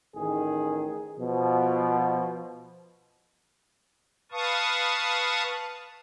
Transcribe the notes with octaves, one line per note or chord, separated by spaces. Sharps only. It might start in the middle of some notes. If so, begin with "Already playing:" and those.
A1 D#3 G#4
B2 F3
B4 F5 A5 C#6 D#6